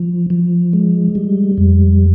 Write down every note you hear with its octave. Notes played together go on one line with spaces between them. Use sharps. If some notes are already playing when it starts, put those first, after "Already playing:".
Already playing: F3
F3
G#3
G3
F2